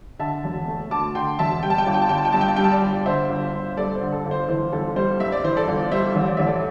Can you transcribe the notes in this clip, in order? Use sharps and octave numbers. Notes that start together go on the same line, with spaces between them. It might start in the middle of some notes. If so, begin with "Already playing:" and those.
D3 E5 A5
E1
A3
D2 A5 D6
D3 G5 C6
E1 E5 A5
G3 G5
A5
G5
G1 A5
G5
A5
G1 G5
A5
G5
G2 A5
G5
A5
G3 G5
A5
D5 G5
G1
D3 C5 E5
G1
G1
G2 A4 D5
C5
D3
A4
G1
C5
E3 C5
G1 A4
G3 C5
G2 E5
D5
E3 C5
A4 D5
G1
G3 C5 E5
A1
D5
A1 E5
A4 D5